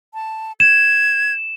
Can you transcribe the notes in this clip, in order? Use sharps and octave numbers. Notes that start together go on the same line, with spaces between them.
A5
G#6 E7